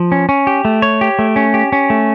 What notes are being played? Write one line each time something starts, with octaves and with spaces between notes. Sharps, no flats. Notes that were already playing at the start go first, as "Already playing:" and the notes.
Already playing: F3
C#4
C#4
G4
A3
C#5
G4
A3
C#4
G4
C#4
A3